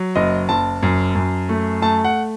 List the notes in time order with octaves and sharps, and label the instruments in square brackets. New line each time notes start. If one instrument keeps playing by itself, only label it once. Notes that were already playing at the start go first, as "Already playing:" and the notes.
Already playing: [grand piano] F#3
F#1 D#5
F#1 A5
F#2
F#2
A3
A3 A5
F#5